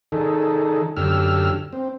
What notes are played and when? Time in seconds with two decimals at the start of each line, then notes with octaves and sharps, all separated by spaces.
0.12 D#3 D#4 G#4 A4
0.96 F#2 D3 G4 E6 F6
1.73 C4